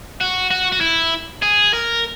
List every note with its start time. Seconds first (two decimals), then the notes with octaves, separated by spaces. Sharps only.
0.21 F#4
0.51 F#4
0.72 F#4
0.81 E4
1.42 G#4
1.74 A#4